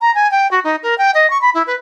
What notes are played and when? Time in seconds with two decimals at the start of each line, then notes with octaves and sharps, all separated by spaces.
0.01 A#5
0.15 G#5
0.31 G5
0.51 F#4
0.64 D#4
0.83 A#4
0.98 G5
1.14 D#5
1.30 C#6
1.42 B5
1.54 E4
1.67 B4